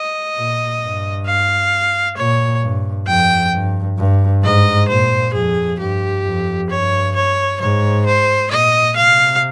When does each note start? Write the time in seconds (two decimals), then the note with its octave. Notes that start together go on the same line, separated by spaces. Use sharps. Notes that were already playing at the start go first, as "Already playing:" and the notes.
Already playing: D#5
0.36 A#2
0.81 G2
1.27 F5
2.16 A#2 C#5
2.62 G2
3.07 F2 G5
3.52 G2
3.98 G2
4.43 G#2 D#5
4.88 A#2 C5
5.34 F2 G#4
5.79 G2 G4
6.24 F2
6.69 G2 C#5
7.15 C#5
7.60 G#2 C#5
8.06 C5
8.51 A#2 D#5
8.96 C3 F5